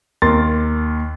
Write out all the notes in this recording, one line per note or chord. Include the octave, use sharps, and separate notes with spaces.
D#2 A#4 C6 A6